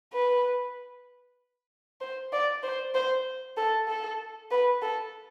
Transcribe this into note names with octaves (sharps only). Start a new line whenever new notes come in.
B4
C5
D5
C5
C5
A4
A4
B4
A4